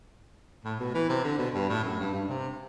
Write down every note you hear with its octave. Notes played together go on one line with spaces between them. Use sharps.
A2
B2
E3
C3
D3
B2
G2
A2
F#2
G2
G2
C3